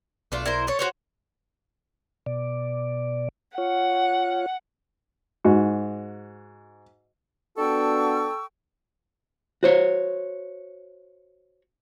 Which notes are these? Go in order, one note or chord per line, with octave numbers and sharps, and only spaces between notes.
B1 A3 D4 F4
E4 A#4 C5
A3 C#5
F#4 C5 C#5
B2 D5
F4 C#5 F#5
G#2 F#4
B3 D4 F#4 A4 G5 C#6 E6
F#4 C5 C#5